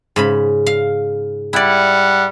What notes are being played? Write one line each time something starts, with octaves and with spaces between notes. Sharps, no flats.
G#2 C#3 B5
F5
G3 E4 D5 F#5